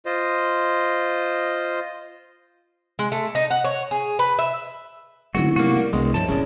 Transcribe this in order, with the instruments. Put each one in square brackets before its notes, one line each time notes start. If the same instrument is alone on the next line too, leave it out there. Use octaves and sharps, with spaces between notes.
[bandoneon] F4 C5 D#5
[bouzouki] G#3
A3
D#4
F#5
C#5
G#4
B4
E5
[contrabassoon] F1 [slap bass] D3 F#3 G#3 [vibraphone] C#4 E4 [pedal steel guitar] F#4
[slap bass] C3 F#3 [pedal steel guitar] A#3 F#4
[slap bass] G3 [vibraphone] A#4
[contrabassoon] E1 [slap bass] C2 [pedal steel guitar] G#3
[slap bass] G2 F3 G3 [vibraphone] G#4 C#5 E5 [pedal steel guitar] A5
[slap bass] D#1 A1 [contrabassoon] C#3 [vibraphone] C4 D5